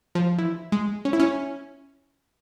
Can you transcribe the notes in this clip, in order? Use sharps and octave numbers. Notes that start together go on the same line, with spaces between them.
F3
E3
G#3
C#4
E4
C#4